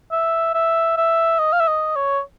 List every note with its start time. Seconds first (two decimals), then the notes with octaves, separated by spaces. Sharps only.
0.11 E5
0.54 E5
0.97 E5
1.39 D#5
1.53 F5
1.60 E5
1.67 D#5
1.96 C#5